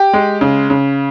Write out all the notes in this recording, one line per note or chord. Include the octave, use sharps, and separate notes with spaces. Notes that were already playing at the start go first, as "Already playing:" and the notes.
Already playing: G4
G#3
C#3
C#3